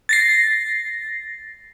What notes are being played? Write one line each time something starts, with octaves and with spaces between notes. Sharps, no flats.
A6 A#6 C7